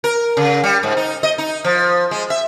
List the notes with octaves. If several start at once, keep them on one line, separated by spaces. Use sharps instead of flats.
A#4
C#3
G3
G#2
D#4
D#5
D#4
F3
G#3
E5